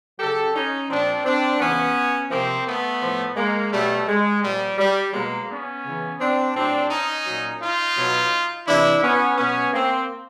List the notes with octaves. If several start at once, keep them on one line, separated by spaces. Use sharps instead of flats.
C#3 F#3 G4 A4
C#4 D#4
A#2 F3 C4 D4
C4 D4
C#3 E3 B3 C#4
C3 F3 A#3 C4
A3 B3
A2 F3
G#3 A#3
B2 F#3 G3 A3
G#3
A#2 F3 G3
G3
B2 F#3 G#3 A#3
B3 C#4
C#3 E3
C4 D4
A2 F#3 C4 D4
C#4 D#4
A#2 F#3
D#4 F4
B2 F#3
C3 E3 D4 E4
B3 C#4
B2 F#3 B3 C#4
A#3 C4